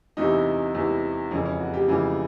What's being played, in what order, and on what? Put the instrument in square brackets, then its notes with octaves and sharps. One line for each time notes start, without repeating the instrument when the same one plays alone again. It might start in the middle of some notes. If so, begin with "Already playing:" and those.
[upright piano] E2 C3 E3 D#4
E2 C3 E3
F2 C#3 E3 C#4
C#4
F#4
G4
F2 C#3 E3